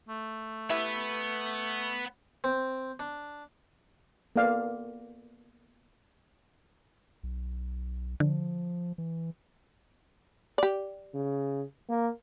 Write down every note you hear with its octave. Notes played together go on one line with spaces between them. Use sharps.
A3
B3 E4 G4 B4 E5
C4
D4
A#3 B3 A4 D5 F5
B1
D3 F3
E3
G4 D5
C#3
A#3